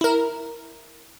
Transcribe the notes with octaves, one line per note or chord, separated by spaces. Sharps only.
E4 A#4